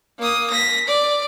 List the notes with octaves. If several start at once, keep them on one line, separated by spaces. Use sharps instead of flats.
A#3 D#6
A#6 B6
D5